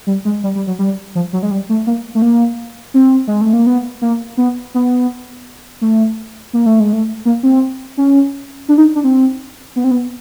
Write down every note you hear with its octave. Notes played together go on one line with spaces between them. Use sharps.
G3
G#3
G3
G3
F#3
G3
F3
F#3
G#3
G3
A3
A#3
A3
A#3
C4
G#3
A3
A#3
B3
A#3
B3
B3
A3
A#3
A3
G#3
A3
A#3
C4
C#4
D4
D#4
D4
C4
B3
C4
B3